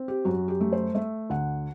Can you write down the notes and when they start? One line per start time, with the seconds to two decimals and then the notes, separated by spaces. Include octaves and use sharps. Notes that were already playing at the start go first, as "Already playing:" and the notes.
Already playing: C4
0.08 G4
0.25 F#2 F#4
0.48 G4
0.61 A3
0.73 C5
0.95 A3 E5
1.30 D2 F#5